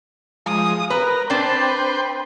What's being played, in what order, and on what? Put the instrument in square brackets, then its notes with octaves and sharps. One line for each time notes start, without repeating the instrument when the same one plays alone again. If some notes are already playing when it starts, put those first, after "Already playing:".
[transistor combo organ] F3 G#3 [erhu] D#6
[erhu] A#4 [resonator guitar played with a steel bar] B4 [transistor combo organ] A#5
[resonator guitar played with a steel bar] C4 D4 [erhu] B4 [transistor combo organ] C5 G5